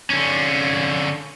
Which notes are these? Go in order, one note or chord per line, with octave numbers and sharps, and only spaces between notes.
D3 C#4